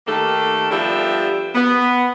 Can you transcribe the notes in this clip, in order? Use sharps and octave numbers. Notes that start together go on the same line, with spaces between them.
D#3 A3 A#3 G4 A4
F3 G3 B3 D4 G4 E5
B3